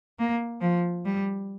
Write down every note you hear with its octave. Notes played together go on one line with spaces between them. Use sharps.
A#3
F3
G3